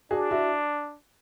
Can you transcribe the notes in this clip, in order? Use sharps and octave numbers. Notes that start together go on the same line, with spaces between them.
D4 F#4 G#4
E4 F#4